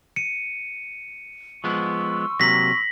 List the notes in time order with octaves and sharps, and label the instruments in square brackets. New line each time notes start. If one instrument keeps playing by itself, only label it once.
[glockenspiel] C#7 D#7
[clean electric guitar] F3 G#3 B3 [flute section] C6 C#6 E6
[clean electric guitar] C3 F#3 A#3 [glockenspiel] A#6 B6 F#7